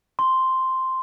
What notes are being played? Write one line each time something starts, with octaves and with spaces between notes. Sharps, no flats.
C6